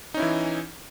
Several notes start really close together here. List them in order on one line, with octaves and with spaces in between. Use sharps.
D#4 C#4 E4 E3